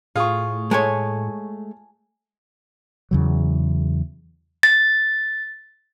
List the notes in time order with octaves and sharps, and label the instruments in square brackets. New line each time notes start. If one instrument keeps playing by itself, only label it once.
[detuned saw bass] A2 [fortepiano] F4 [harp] G#4 C#6
[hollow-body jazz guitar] G#3 A3 C#5 [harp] G#5 A5 G#6
[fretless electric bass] E2 C#3 F#3
[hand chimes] A6